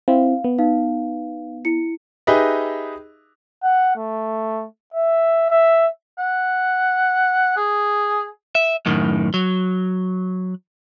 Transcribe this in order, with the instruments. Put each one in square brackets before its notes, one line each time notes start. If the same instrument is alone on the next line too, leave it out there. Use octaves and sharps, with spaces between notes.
[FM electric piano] C4 E4 [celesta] F5
[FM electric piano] B3
[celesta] D#4 F5
E4 C#7
[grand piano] D#4 G4 G#4 B4 D#5 E5
[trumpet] F#5
A3
E5
E5
[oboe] F#5
G#4
[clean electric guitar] E5
F#2 A2 D#3
F#3